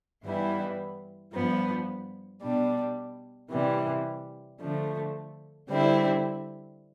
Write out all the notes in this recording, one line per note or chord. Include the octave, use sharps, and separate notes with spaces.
G2 E3 G3 B3 E4
G2 F3 B3
B2 G3 D4
C3 E3 G3
D3 F3 A3
D3 G3 C4 E4